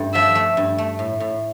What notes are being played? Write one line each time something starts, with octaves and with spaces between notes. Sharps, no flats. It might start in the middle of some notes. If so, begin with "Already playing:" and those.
Already playing: G2 A3
F3 E5
A3
G2
A3
A2
A2